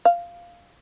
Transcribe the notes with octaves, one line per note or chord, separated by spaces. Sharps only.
F5